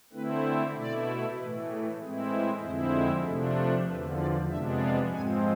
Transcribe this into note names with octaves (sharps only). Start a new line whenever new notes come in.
D3 A3 C4 E4 B4
C5
B2 A3 E4 D5
A2 E3 A3 B4
G#4
A2 E3 G#3 C4 E4 G#4
A4
F2 D3 G#3 C4 E4 C5
G#4
C3 F3 A3 D4 A4
A4
E2 D3 F3 B4
D5
F2 C3 G#3 B3 D4 E5
F5
G#2 F3 G#3 C4 G#5